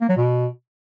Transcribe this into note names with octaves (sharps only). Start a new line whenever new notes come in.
A#3
F#3
B2